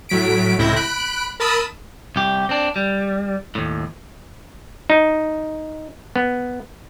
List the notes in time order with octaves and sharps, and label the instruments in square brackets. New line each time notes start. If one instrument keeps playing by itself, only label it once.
[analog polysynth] A2 F#3 B6 D7
C#2 A2 C3 E4 G6 A#6
B5 F#6 D7
A#4 A5 B5 D#6 E6
[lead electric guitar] C2 G4
C4 D4
G3
D#2 A2
[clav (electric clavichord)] D#4
B3